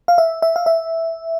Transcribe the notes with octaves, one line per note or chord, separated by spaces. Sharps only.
F5
E5
E5
F5
E5